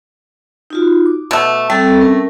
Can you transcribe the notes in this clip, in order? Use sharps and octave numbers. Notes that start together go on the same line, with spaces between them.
D#4 F4 F#4
D6
B2 A3
G3 A3 C4 A4
C#4 A#4 A5